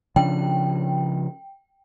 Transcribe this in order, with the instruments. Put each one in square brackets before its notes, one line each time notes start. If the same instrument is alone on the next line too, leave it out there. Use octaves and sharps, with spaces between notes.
[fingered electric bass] C#3 F3 D4 [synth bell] G5